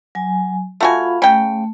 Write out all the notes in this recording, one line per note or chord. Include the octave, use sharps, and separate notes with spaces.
F#3 G#5
A3 F4 F#4 F5 G#5 B5
C#3 A3 G5